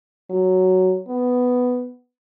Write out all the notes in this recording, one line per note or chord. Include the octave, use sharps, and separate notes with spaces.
F#3
B3